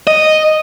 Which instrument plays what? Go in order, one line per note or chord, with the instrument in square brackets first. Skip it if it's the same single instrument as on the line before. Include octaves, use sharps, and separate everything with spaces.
[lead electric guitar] D#5